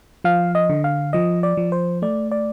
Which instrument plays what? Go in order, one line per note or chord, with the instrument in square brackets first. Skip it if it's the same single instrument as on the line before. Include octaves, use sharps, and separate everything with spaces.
[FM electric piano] F3 F5
D#5
D3
F5
F3 D#5
D5
F3
C5
A3 D5
D5